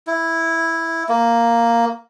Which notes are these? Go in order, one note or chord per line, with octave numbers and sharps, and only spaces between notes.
E4
A#3